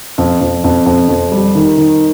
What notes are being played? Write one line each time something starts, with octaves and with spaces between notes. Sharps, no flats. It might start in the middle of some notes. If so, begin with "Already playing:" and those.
F2
F2
F2
F2
F2
G3
D#3
D#3